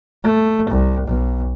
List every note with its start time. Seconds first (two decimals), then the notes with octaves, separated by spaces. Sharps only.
0.24 A3
0.70 C2
1.08 B1